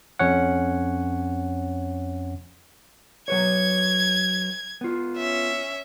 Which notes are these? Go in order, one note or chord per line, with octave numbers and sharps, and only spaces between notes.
F2 C#4 C#5 F#5
F#3 B4 C#5 G#6
B3 F4
C#4 E5